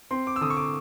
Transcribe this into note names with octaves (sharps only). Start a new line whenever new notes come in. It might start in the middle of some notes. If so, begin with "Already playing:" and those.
C4 C6
D6
E6
D3 D#6
C#6
D6